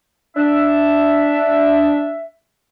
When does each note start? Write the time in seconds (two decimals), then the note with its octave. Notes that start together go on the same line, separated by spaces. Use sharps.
0.37 D4 E5